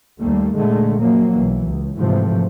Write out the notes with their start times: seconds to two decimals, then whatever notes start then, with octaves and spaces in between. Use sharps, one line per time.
0.21 D#2 G3 A3 A#3
0.56 A#2 D3 G#3 A3
0.99 F3 F#3 A#3
1.35 B1 E3
1.68 C#2
1.98 G#2 C3 E3 F3 A3